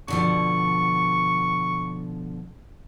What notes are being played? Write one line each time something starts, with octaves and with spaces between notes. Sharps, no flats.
B2 D3 F3 C#6